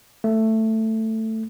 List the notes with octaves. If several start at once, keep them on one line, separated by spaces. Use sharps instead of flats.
A3